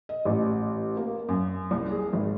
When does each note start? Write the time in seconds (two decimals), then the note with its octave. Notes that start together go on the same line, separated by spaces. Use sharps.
0.09 D#5
0.25 A1
0.97 A#3
1.28 F#2
1.71 C2
1.91 G#4
2.13 G#1